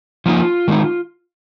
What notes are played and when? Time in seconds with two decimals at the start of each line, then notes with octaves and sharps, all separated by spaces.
0.26 F3 A#3 D#4 F4
0.68 D#3 G#3 D#4